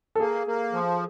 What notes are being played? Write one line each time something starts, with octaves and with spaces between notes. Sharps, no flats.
A4
A#3 G#4
A#3
F3